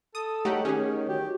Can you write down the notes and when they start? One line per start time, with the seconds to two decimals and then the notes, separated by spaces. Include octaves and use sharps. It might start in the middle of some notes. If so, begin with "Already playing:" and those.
0.15 A4 D#6
0.45 A3 D#4 G4 C#5 F#5
0.65 D#3 C#4 G#4
1.08 F#4 G4